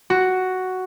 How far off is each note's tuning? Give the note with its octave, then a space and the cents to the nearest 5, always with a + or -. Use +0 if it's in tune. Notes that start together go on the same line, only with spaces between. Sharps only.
F#4 +5